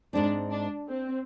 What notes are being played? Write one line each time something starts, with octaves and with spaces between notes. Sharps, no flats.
G#2 G#3 C4 D4
D4
C4